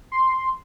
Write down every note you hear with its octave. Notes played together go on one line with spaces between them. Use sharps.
C6